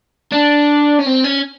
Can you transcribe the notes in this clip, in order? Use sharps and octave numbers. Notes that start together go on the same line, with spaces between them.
D4
C#4
C4
C#4